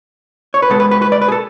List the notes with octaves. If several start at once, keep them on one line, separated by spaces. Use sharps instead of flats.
C#5
B4
B2 G#3 B3 A4
B4
B4
B4
D5
B4
G#4
A4